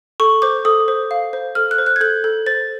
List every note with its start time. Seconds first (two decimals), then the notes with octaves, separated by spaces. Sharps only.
0.20 A4 C#6
0.42 C5 D6
0.65 A4 D#6
0.88 C5
1.11 F5
1.33 C5
1.55 A4 F6
1.71 F#6
1.78 C5
1.86 F#6
1.96 G#6
2.01 A4 G6
2.24 A4
2.46 C5 A6